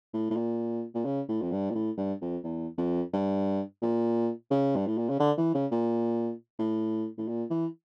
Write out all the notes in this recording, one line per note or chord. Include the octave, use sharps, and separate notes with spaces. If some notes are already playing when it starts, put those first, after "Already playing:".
A2
A2
A#2
A#2
C#3
A2
F2
G2
A#2
A2
G2
F2
E2
F2
G2
A#2
C#3
G2
A2
A#2
C#3
D3
E3
C#3
A#2
A2
A2
A#2
E3